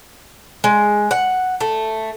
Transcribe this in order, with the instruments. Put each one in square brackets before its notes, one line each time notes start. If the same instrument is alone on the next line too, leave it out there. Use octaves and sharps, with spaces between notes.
[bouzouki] G#3
F#5
A3